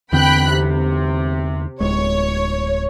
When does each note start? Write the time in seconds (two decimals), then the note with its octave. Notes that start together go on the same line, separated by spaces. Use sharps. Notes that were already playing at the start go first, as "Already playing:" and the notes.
0.12 E2 D3 C4 G5 B5 F#6
0.52 C3
1.80 D1 G#3 C#5